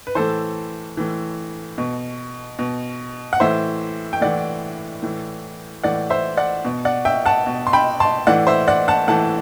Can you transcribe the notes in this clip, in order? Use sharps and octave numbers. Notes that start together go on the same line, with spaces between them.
B4
A2 E3 A4 C5
A2 E3
B2
B2
F#5
A2 E3 C5 E5
G5
A2 E3 D5 F#5
A2 E3
A2 E3 D5 F#5
C5 E5
D5 F#5
B2
D5 F#5
E5 G5
F#5 A5
B2
C6
G5 B5
A5 C6
A2 E3 D5 F#5
C5 E5
D5 F#5
F#5 A5
A2 E3 F#5 A5